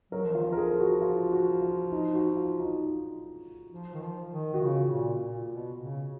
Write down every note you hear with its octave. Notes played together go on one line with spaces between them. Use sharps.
F#3 A#4
F3
D#3 F4
F3
A#4
G#4
F#4
F4
F#4
F4
D#4
F#4
F4
D#4
F3
D#3
F3
D#3
D#3 F#4
C#3 F4
A#2
A#2
B2
C#3